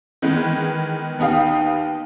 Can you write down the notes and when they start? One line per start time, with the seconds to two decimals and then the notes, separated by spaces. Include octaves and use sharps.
0.22 D#3 E3 G#3 B3
1.19 D#2 B3 D#4 G4 F5